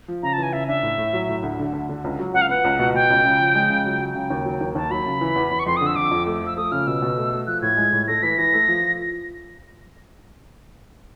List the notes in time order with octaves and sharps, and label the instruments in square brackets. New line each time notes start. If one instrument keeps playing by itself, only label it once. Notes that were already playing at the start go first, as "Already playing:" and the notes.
[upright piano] F3
[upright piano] C#3 [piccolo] A#5
[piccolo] A5
[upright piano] E3 [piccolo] G#5
[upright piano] C#3 [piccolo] E5
[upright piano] D4 [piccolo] E5
[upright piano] A2
A2
F#3
A2
D2
D3
D2
D3
C#2
F#3
[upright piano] C#2 [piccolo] F#5
[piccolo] F5
[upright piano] B3 [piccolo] F#5
[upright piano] C#2
B2
[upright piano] B2 [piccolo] G5
[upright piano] C#2
C#3
F3
G#3
C#3
F#3
F#3
[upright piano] C#3 [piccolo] G5
[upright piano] D#2
F#3
D#2
[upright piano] D#2 [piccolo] A5
[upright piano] F#3 [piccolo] B5
[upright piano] C#3
E3
E2
E2
[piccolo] C#6
[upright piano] F2 [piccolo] C6
[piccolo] D#6
[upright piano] D3
[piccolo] E6
[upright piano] F2 [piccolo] D6
[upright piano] F2
A3
[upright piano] F3 [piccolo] E6
[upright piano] A3 [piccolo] D#6
[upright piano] C#3 [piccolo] F6
[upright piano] B2 [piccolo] E6
[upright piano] B2
A3
A3
[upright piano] F3 [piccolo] F#6
[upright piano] A2 [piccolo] G#6
[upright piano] G#3
A2
[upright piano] A3 [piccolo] A#6
[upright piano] E3 [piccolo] B6
[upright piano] E3 [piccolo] A#6
[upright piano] A3
F3